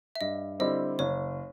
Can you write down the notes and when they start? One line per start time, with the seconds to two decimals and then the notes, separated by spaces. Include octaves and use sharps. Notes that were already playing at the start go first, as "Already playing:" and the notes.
0.16 E5
0.21 G2 D#5
0.60 D3 G3 C4 E4 D#5
0.99 F#1 C#5